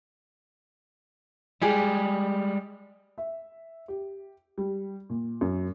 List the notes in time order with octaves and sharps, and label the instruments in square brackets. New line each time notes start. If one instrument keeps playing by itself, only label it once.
[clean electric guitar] G3 G#3 [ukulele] G4 G#4
[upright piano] E5
G4
G3
A#2
F#2